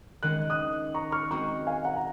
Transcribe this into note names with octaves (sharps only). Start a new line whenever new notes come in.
D#3 G#3 C#4 F#6
D#6 F#6
A#5 C#6
C#6 F6
G#3 C4 F#4 A#5 C#6
F5 G#5
F#5 A#5
A#5